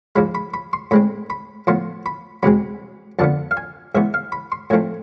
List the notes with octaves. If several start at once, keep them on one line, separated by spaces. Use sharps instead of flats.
G#2 F3 G#3 B5
B5
B5
C6
A2 G#3 C4 B5
B5
A2 F3 B3 C6
B5
E2 B2 G#3 C4 B5
F2 D3 F3 B3 A5
F5
G#5
G#2 E3 B3 E5
F5
B5
C6
A2 F3 A3 C4 G#5